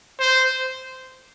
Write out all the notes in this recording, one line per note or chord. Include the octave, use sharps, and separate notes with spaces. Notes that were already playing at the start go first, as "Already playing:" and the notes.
C5